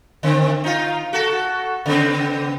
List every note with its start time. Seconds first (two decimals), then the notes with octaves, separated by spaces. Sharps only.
0.23 D3 C4
0.64 D#4 F4
1.13 F#4 A4
1.86 C#3 B3 C4